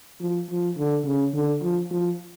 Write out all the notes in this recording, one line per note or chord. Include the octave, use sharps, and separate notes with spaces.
F3
F3
D3
C#3
D3
F3
F3